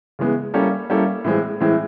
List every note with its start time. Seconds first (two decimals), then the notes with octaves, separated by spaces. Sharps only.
0.19 C#3 E3 G#3 B3
0.54 G3 A#3 C#4 E4 A4
0.90 G3 A#3 C#4 E4 A4
1.24 A2 E3 G#3 C4
1.60 A2 E3 G#3 C4